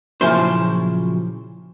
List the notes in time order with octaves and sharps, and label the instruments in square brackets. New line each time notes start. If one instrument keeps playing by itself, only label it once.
[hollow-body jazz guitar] A#2 C#3 F3 F#3 E4 C5